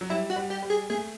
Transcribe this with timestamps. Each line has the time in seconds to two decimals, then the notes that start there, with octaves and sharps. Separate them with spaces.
0.01 F#3
0.10 G3 E4
0.30 F#4
0.36 G3
0.50 G4
0.63 G3
0.70 G#4
0.90 A3 G#4